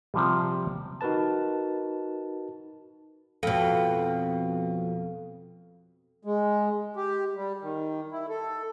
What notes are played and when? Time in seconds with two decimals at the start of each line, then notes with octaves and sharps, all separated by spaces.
0.14 C3 F3 G3
1.01 D#4 F#4 A#4 B4 A5
3.43 F2 B2 A4 F5
6.24 G#3
6.96 G4
7.36 G3
7.62 D#3
8.12 E4
8.29 A4